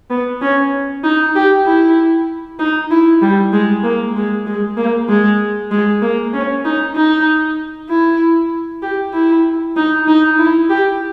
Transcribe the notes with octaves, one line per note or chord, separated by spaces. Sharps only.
B3
C#4
D#4
G4
E4
D#4
E4
G3
G#3
A#3
G#3
G#3
A#3
G#3
G#3
A#3
C#4
D#4
D#4
E4
G4
E4
D#4
D#4
E4
G4